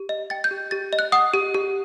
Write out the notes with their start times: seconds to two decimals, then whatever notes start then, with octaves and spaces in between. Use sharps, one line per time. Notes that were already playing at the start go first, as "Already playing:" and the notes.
Already playing: G4
0.09 D#5
0.30 G5 A6
0.44 G6
0.51 G4
0.71 G4 A6
0.93 D#5
0.99 F#6
1.12 F#5 D#6
1.34 G4
1.54 G4